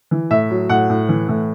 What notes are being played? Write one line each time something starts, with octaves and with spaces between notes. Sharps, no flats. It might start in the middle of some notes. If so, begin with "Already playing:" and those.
E3
A2 E5
F#3
A2 F#5
A2
E3
A2